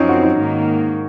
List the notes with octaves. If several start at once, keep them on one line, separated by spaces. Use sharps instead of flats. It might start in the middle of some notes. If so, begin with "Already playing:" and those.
Already playing: F#2 F3 C4 C#4 D#4
F#4
D#4
G#2 D#3 A#3